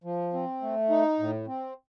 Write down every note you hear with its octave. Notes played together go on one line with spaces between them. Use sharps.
F3
C4
A3
D#4
A2
C4